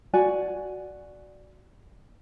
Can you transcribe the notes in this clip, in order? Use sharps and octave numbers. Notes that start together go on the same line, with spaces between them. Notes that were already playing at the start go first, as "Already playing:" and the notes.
F#4 D5 G#5